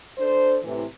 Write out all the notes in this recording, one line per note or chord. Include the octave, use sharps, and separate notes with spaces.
D4 A4 C5
A2 C3 E3